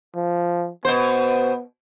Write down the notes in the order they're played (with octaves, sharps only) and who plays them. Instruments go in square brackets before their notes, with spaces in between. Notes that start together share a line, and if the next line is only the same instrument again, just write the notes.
[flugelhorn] F3
[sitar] B2 C5 [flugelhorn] B3